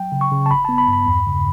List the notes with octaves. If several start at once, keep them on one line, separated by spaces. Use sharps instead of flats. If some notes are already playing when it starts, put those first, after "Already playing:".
Already playing: F#3 G5
C#3
C#6
C#3
A5
G1 B5
B3 A5
B5
G2
B5
E2
C#3